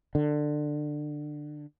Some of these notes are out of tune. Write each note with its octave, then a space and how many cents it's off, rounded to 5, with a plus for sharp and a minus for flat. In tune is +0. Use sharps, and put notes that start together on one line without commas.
D3 +20